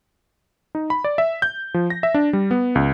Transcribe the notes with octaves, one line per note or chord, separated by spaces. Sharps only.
D#4
B5
D5
E5
G6
F3
A#6
E5
D4
G3
B3
C#2